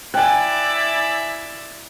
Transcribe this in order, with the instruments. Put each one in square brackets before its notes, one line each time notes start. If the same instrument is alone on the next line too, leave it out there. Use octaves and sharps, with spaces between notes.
[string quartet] E4 D5 E5 [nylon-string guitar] G5 [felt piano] G#5 F#6